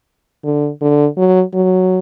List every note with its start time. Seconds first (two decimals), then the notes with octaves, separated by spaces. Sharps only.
0.44 D3
0.81 D3
1.17 F#3
1.54 F#3